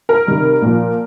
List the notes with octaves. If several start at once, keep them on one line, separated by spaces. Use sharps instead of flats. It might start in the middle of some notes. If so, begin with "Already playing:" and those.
A#4
C3 D#3 G3
A#2 F3